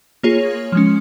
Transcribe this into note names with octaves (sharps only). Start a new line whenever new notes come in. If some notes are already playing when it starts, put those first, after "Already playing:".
A#3 F4 G#4 C#5
F3 G#3 C#4